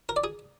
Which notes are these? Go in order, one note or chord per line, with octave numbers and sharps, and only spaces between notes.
A#4
D5
G#4